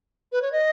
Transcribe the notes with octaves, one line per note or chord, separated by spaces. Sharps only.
B4
C#5
D#5